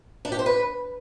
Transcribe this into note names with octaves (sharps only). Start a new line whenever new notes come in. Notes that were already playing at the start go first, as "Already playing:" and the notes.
D4
G4
C5
B4